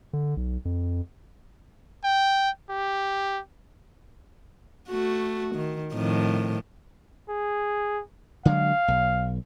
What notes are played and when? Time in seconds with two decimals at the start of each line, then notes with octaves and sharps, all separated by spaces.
0.13 D3
0.37 B1
0.65 F2
2.04 G5
2.69 G4
4.88 A3 F#4
5.55 D#3
5.94 F2 A2 D#3
7.29 G#4
8.45 D3 F#3 G#3 F5
8.88 B1